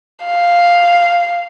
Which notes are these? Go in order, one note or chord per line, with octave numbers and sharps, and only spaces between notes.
F5